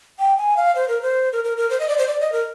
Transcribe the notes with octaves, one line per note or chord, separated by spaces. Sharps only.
G5
G#5
F5
C5
A#4
C5
A#4
A#4
A#4
C5
D#5
D5
C5
D5
D#5
A#4